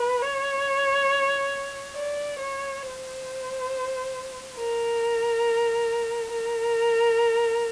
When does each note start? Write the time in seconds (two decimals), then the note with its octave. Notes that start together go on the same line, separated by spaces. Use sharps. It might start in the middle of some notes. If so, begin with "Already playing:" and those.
Already playing: B4
0.22 C#5
1.95 D5
2.39 C#5
2.82 C5
4.57 A#4
6.31 A#4